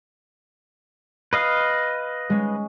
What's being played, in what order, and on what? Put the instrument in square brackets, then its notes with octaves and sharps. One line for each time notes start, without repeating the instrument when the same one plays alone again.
[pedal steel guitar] B4 D#5 F5
[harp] G#3 C#4